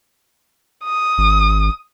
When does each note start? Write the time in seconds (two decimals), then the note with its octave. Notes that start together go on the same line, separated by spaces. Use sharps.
0.85 D#6
1.18 G#1